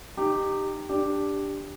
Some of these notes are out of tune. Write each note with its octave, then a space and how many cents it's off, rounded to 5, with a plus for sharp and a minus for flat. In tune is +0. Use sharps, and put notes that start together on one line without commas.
D#4 -25 G4 +0
D4 +0 G4 +0